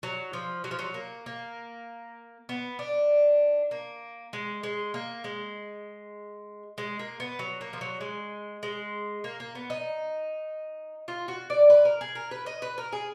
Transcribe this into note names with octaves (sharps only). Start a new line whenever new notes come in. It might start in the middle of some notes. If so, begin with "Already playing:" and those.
F#3
F3
F#3
F3
F#3
A#3
A#3
B3
D4
A#3
G#3
G#3
A#3
G#3
G#3
A#3
B3
F#3
A#3
F3
F#3
G#3
G#3
A#3
A#3
B3
D#4
F4
F#4
D5
B4
A#4
G#4
A#4
B4
D#5
B4
A#4
G#4